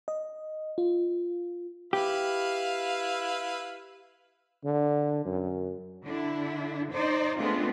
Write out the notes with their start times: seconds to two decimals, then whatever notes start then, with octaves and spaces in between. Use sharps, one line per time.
0.08 D#5
0.78 F4
1.93 E4 G4 B4 F5
4.64 D3
5.25 F#2
6.04 D3 D4 E4
6.92 D#4 C5 D5
7.38 G#3 A3 B3 C4 D4 F4